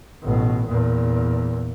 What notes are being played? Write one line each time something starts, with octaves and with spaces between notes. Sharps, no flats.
A1 B2
E2 A#2